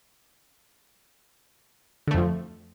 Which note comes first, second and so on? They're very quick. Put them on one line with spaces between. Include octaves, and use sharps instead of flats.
D3 A3 F2 F3